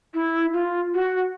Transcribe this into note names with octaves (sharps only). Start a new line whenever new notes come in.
E4
F4
F#4